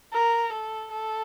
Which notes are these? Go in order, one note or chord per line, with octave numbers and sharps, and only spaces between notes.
A#4
A4
A4